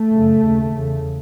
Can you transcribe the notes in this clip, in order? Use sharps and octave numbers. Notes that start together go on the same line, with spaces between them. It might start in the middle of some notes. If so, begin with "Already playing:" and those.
Already playing: A3
F#2 C#3
D#2 C#3
E2 C#3